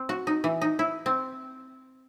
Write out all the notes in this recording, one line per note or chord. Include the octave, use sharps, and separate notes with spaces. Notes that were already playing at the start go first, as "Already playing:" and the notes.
Already playing: C4
F#4
D#4
E3
D#4
E4
C4